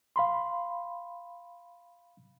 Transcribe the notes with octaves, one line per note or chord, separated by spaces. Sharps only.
F5 B5 C6